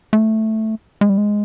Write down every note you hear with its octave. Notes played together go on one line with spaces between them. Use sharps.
A3
G#3
G3
G#3